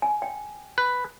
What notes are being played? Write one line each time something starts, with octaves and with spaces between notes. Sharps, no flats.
G#5
G5
B4